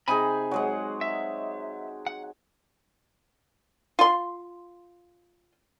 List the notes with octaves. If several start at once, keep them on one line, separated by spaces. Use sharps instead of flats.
C3 D#4 G#4 G#5 B5
F#3 G#3 F#5
E5
F#5
F4 C6